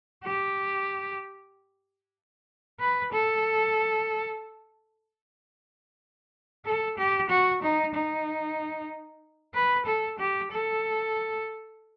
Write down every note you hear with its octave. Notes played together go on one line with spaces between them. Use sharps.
G4
B4
A4
A4
G4
F#4
D#4
D#4
B4
A4
G4
A4